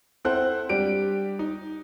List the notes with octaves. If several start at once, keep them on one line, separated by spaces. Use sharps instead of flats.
C4 E4 A4 C5 F#5 F#6
G3 D4 G4 D7
D#4